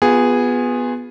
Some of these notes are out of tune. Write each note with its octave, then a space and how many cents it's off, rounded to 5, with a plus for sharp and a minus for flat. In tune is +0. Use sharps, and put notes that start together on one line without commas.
B3 +0 F4 +25 G#4 -10